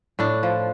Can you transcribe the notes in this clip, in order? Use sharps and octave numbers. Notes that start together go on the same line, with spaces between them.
A2 D4
F3